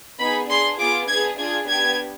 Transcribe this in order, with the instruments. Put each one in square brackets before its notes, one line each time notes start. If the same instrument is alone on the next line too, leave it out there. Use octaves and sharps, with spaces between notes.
[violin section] B3 D#4 G#4 B5
D4 G#4 C6
B3 F4 G#4 D6
B3 D4 G#4 G#6
D4 F4 G#4 G#6
B3 D4 G4 G#6